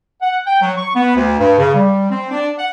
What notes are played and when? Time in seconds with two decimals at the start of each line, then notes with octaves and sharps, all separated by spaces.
0.21 F#5
0.46 G5
0.61 F#3
0.77 C#6
0.95 B3
1.15 D2
1.38 G2
1.59 C#3
1.74 G3
2.10 C4
2.31 D4
2.58 F#5